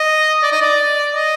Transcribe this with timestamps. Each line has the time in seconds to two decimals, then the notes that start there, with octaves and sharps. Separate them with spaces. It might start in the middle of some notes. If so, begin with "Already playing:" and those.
Already playing: D#5
0.43 D5
0.52 D#5
0.62 D5
1.15 D#5